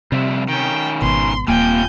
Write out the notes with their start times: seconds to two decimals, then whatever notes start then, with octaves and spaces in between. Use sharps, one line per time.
0.12 F2 C3 G3 E5
0.48 D#3 C#4 G5
1.02 G#1 B2 C6
1.48 D#1 C3 A#3 F4 G5 G#5 G6